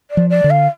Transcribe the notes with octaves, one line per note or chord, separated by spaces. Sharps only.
D5
F3
D5
D3
F5